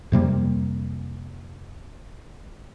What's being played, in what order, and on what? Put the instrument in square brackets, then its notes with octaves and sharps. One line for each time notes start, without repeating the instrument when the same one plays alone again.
[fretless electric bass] F2 C3 G3 A#3